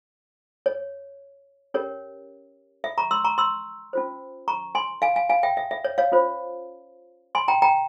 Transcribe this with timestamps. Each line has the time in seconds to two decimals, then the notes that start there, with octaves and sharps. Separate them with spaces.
0.66 C#5
1.74 C#4 G4 A#4 C#5
2.84 E5
2.98 A#5 C#6
3.11 C6 E6
3.25 A#5 C#6
3.38 C6 E6
3.93 C#4 F4 C5
4.48 A#5 C#6
4.75 G#5 C6
5.02 F5 G#5
5.16 F5 G#5
5.30 F5 G#5
5.43 E5 G5
5.57 E5
5.71 E5
5.85 C#5
5.98 C#5 F5
6.12 C#4 F4 C5
7.35 G#5 C6
7.48 G5 A#5
7.62 G5 A#5